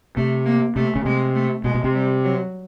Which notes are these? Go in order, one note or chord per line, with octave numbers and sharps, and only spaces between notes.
C3 A3
A#3
C3 A3
C#3
C3 G#3
A3
B2 G#3
B2
C3
G3
F#3